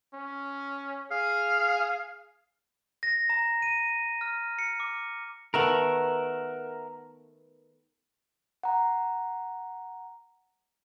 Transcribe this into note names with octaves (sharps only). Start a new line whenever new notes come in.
C#4
G#4 F5
A#6
A#5
D#7
F6
C#7
D6
D#3 A3 B3 A#4 E5 F#5
F#5 A#5